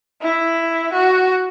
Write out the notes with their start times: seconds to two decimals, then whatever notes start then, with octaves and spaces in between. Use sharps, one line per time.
0.22 E4
0.93 F#4